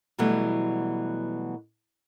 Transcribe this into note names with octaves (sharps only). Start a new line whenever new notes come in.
B2 E3 F#3 G3 A3 B3